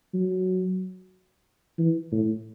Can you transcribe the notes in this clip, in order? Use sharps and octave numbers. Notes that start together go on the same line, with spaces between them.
F#3
E3
A2